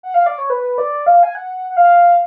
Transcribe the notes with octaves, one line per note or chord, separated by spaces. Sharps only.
F#5
F5
D5
C#5
B4
D5
F5
G#5
F#5
F#5
F5